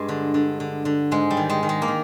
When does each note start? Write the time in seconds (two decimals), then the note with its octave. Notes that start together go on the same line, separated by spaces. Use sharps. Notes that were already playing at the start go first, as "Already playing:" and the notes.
Already playing: G2 G#3
0.09 D3
0.34 D3
0.60 D3
0.85 D3
1.12 G#2 G#3
1.31 G3
1.37 D#3
1.50 G#3
1.63 D#3
1.69 G#3
1.82 A#3
1.88 D#3